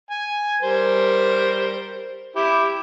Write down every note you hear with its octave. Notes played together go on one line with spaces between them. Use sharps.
G#5
G3 A#4 C5
E4 G4